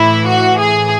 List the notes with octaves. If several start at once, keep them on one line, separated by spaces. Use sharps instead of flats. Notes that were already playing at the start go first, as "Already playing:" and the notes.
Already playing: A2 E3 E4
F#4
G#4